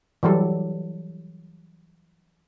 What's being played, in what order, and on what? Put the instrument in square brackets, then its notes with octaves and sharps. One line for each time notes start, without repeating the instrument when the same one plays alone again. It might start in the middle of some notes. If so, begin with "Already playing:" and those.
[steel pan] E3 F#3 G3 A4